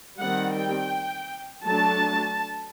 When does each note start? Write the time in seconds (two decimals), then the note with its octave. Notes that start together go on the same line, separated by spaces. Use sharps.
0.21 D#3 G3 C4 F#5
0.57 G5
1.65 F#3 A3 D4 A5